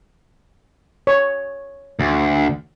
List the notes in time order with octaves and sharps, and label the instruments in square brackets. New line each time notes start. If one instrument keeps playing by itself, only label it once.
[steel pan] C#5
[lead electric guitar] D2